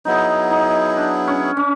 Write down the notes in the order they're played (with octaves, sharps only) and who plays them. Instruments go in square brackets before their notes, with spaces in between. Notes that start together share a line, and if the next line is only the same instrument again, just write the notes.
[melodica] F#3 B3 E4 G#4 [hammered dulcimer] D#4
[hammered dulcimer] D#4
D4
C#4
C#4